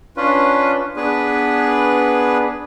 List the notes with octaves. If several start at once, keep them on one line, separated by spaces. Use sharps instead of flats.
C#4 D4 F4 B4
B3 D4 G#4 B4